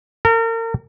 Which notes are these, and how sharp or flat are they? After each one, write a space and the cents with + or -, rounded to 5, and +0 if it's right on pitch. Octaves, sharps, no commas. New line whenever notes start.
A#4 -35